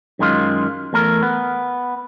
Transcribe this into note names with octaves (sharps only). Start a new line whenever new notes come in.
F#2 D#3 G#3 F4
E2 A3 A#4
B3